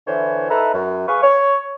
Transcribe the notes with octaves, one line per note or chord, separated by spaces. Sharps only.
D3 E3 E4 C5 C#5
D#4 A4 B4 E5 A#5
F#2
G#4 B4 F5 C#6
C#5